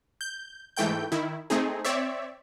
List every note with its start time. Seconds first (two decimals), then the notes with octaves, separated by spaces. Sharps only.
0.21 G6
0.77 G#2 E3 A3 G5 G6
1.12 D#3 E4
1.50 A3 C4 D#4 G#4
1.85 C4 C#5 D5 E5